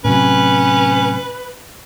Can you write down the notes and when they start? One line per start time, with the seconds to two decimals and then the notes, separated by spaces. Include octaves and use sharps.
0.04 A2 C3 F#3 C#4 B4